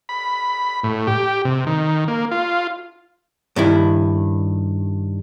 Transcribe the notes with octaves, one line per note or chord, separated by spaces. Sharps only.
B5
A2
G4
C3
D#3
A#3
F4
G2 D#3 E4